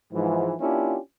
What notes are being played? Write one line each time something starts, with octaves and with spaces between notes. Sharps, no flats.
G#2 E3 F3
A#3 C#4 D4 E4 F4 G4